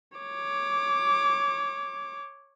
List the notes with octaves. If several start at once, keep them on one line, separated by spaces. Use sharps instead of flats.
C#5 D6